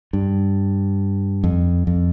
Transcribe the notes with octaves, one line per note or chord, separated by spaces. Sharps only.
G2
F2
F2